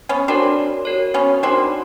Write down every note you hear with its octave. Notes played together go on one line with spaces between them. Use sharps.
B3 C#4
C4 D4 F#4 A#4 C#5
F#4 A#4 C#5
B3 C#4
C4 D4 D#4 F#4 A#4 C#5 F#5